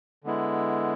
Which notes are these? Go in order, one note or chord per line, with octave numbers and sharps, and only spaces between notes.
D3 G#3 B3 E4